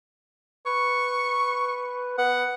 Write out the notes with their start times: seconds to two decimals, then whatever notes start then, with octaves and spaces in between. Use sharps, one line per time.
0.66 B4 C#6
2.18 B3 F#5